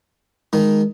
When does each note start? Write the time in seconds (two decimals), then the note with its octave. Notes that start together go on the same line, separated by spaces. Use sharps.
0.53 D#3 G#3 D#4